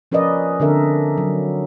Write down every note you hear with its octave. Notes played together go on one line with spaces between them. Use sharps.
F3 C#4 A#4 B4 D5 D#5
D3 C4 D4 A4 A#4 E5
F#3